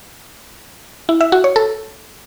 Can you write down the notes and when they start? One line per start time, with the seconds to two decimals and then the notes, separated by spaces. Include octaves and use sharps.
1.09 E4
1.21 E5
1.32 F#4
1.44 C#5
1.56 A4